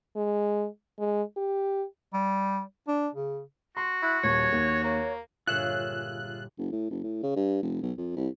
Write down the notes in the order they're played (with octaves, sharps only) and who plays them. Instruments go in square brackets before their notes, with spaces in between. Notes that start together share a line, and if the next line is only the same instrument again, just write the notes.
[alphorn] G#3
G#3
G4
[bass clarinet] G3
D4
C#3
[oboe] F#4 [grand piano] C6
[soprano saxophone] E4 [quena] F#6
[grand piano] D#1 [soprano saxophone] C#5 [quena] G#6
[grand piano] D#2
[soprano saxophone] A#3 [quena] C#5
[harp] G1 A#2 C#5 [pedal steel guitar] F4 G#4 E5 [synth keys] F#6
[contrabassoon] F#1
A2
F#1
A2
C#3
G2
F1
B1
F2
C2